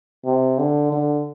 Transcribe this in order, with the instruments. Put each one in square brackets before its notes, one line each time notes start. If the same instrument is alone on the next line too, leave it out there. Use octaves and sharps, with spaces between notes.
[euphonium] C3
D3
D3